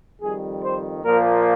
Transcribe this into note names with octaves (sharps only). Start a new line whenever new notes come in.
F2 D#3 G3 G#4
C5
A#2 F3 A#3 A#4